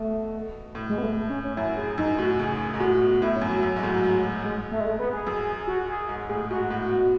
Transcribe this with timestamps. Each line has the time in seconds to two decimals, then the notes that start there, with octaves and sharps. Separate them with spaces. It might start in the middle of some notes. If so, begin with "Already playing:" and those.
Already playing: B2 A3
0.75 A2
0.89 G#3
0.98 B3
1.03 A3
1.17 A3
1.30 C#4
1.44 C#4
1.57 F#2 E4
1.77 G#4
1.98 F#2 D#4
2.19 A2 F#4
2.39 C#3 G#4
2.74 G#2
2.80 A2 F#4
2.94 F#4
3.01 B2
3.08 F#4
3.22 A2 E4
3.36 C#4
3.41 F#2
3.49 F#3
3.63 F#2
3.76 G#2
3.83 A2
4.03 G#2
4.44 G#3
4.71 A3
4.80 G#3
4.86 A3
4.99 B3
5.13 G#4
5.27 F#2
5.67 F#4
5.88 G#4
6.09 G#2
6.29 A2 G#4
6.51 G#2 F#4
6.70 A2
6.91 B2